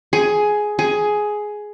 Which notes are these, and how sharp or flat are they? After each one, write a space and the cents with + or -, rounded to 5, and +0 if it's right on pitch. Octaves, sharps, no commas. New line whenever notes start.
G#4 +10
G#4 +10